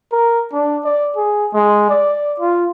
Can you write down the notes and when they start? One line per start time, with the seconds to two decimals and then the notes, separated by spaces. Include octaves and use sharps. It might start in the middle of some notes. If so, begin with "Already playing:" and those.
0.12 A#4
0.53 D4
0.85 D5
1.16 G#4
1.53 G#3
1.90 D5
2.40 F4